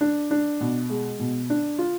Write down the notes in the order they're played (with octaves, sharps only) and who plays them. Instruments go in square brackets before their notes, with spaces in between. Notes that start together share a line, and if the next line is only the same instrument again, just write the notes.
[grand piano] D4
D4
B2
G#3
B2
D4
F4